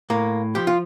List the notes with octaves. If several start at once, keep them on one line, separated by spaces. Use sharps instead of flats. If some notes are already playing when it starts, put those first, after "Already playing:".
A2 A#3
F3 G4
F4